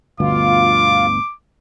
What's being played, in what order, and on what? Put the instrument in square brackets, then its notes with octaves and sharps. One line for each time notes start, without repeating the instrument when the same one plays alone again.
[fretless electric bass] G1 D2 B2 [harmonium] F4 [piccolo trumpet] D6